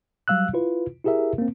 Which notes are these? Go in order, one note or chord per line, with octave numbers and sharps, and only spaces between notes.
F#3 G3 F5 E6 F#6
E4 F4 B4
E4 G4 G#4 A#4 E5
A#3 C4